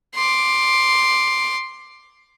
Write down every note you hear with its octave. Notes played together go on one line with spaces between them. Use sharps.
C6 D6